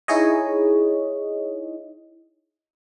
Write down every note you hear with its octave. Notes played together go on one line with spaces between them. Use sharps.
D#4 E4 G#4 C#5 D#5